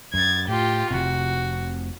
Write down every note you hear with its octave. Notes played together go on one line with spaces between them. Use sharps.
F#2 G#6 A6
A2 F4 G4
F1 C3 F#4